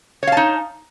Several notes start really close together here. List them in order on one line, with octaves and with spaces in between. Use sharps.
C#5 F5 A5 D#4